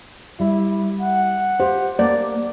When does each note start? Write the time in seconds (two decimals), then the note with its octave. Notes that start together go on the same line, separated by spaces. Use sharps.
0.40 G3 E4
1.01 F#5
1.60 G4 C5 F5
1.99 A#3 D5